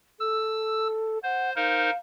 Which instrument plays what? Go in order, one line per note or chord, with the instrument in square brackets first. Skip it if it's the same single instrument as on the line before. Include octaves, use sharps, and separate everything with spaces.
[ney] A4 [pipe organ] E6
[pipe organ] C5 [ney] F#5
[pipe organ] D#4 A#4 C5 [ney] F5